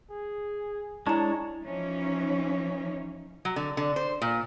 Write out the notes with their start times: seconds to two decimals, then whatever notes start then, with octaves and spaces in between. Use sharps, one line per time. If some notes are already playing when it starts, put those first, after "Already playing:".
0.11 G#4
1.06 G#3 D4 E4 C#5 A5 A#5
1.64 E3 F3 C#4 D#4
3.45 F#3
3.56 D3
3.77 D3
3.96 C5
4.22 A#2